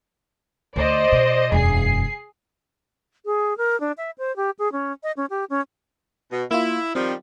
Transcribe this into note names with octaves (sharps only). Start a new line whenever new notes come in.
D2 C5 D5 D#5
B2
E1 F#2 G#4 C7
G#4
A#4
D4
E5
C5
G4
G#4
C#4
D#5
C#4
G4
C#4
B2
A#3 E4 F4
D#3 F3 G3 C4